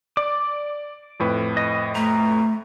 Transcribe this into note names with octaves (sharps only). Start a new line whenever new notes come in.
D5 D6
F2 A2 B4
D#5
A3 A#5